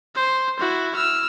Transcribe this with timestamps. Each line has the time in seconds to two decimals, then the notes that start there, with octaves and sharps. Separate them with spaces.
0.15 C5
0.59 E4 F#4
0.95 E6 F6